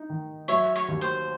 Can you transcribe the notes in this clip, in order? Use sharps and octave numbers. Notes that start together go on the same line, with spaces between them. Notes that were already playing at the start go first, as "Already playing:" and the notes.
Already playing: D#4
D#3
F#3 C#5 E5
C#5
D#2
C5